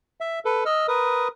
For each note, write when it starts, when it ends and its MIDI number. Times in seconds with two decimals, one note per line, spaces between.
0.21 0.39 76
0.45 0.64 69
0.45 0.64 71
0.66 0.87 75
0.66 0.87 88
0.66 0.87 89
0.88 1.28 70
0.88 1.28 71
0.88 1.28 87